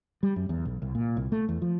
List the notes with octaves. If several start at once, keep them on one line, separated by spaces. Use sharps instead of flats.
G3
F#2
E2
B1
C2
A#2
C2
A3
E2
F3